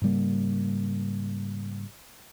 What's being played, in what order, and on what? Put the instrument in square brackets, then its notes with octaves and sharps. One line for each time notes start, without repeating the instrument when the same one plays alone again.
[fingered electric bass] G#2 C#3 G3 A#3